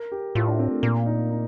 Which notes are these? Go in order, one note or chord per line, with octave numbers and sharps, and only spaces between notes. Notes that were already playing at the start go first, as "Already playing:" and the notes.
Already playing: A#4
G4
A2 F4
D4
C4
A3
A#2 A#3
D#4
D#4